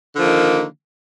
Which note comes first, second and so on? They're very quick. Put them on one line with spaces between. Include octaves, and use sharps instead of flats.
D3 F3 A#3 D#3